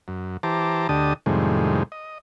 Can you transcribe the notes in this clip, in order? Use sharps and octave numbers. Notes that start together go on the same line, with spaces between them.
F#2
E3 G4 C5 A5 A#5 D6
D2 D3 G4 D#5 A5 D#6
F2 A2 C3 D#3 G3 G#3
D#5